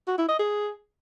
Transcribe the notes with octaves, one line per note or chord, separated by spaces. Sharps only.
F#4
E4
D#5
G#4